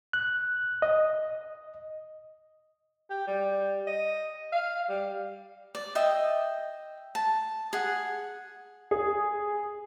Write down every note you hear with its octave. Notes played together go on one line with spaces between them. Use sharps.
F#6
D#5
G4
G3
D#5
F5
G3
D5
D#5 E5 G5
A5
G#4 F#5
G#4